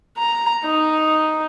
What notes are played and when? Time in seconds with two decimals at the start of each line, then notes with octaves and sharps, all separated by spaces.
0.17 A#5
0.64 D#4